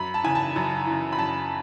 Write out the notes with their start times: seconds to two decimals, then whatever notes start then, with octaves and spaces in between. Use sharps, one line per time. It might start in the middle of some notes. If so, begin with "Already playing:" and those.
Already playing: F#2 B5
0.14 A5
0.24 C#3 E3 G#5
0.35 A5
0.56 F#2
0.87 C#3 E3
1.13 B5
1.18 F#2 A5